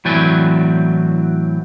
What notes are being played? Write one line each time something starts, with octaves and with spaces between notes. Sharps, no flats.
A2 E3 F#3 C4 D5 G#5